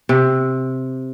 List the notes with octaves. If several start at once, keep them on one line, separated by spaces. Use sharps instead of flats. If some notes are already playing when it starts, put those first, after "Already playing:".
C3